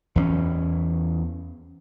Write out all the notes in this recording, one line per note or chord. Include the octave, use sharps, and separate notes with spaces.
E2 A3 C#4